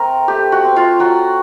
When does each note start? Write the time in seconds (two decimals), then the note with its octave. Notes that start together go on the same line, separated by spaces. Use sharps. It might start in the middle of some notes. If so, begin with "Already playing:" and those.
Already playing: A3 C4 A#4
0.28 A3 G4
0.52 F#4
0.65 C4
0.76 F4
0.99 F#3 F#4